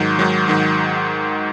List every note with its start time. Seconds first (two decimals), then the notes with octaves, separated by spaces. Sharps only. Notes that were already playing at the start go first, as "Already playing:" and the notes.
Already playing: G#2 D#3 F#3
0.19 G#2 D#3 F#3
0.48 G#2 D#3 F#3